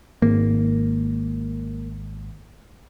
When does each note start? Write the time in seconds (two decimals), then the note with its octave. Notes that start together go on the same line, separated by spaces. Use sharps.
0.22 G#1 A#3